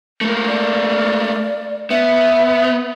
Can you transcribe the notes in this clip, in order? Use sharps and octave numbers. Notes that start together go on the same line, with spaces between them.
A3 A#3
D5
B3 E5